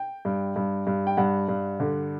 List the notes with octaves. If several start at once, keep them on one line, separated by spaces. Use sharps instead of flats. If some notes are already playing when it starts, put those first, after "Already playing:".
Already playing: G5
G2
G2
G2
G5
G2 F#5
G2
D3